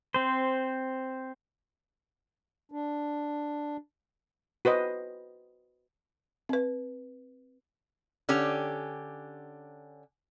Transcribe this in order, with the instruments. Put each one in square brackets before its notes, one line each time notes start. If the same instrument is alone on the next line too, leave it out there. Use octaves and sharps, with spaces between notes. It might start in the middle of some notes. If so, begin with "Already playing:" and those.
[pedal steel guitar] C4 C5
[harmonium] D4
[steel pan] F#4 B4 C5 D#5
[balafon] C4 B4
[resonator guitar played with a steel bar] D3 C#4 G4